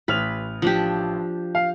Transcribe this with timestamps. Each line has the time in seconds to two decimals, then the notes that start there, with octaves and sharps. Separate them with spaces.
0.08 A1 B4 F6 F7
0.62 F3 D4 G4
1.55 F5